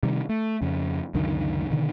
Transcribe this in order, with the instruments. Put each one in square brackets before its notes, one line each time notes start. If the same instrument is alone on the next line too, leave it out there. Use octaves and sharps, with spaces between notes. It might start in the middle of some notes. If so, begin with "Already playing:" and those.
[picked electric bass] C3 D#3 G3
A3
F2 C#3
C#2 F#2 D3 D#3
B2 D3 D#3